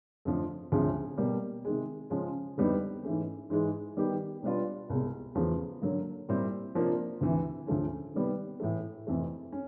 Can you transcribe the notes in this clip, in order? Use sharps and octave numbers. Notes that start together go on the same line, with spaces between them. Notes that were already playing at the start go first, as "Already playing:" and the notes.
F2 D3 F3 A3
D2 C3 F3 G#3 C#4
B2 G3 A#3
C3 D#3 G#3
C#3 F3 G#3 C#4
F2 D3 G3 B3 D#4
G#2 E3 A3 C#4
G#2 E3 G#3
D#3 G3 B3 D#4 G4
B2 G3 B3 D4 F4
C2 B2 G#3
E2 C#3 F3 A3
D3 F#3 A#3
A#2 G3 C4 E4
C3 F3 A#3 D4 F4
D2 C3 E3
D2 C#3 F3 A3 C#4
C3 D#3 G3 B3
A2 E3 A3
F2 C3 E3 A3
C#4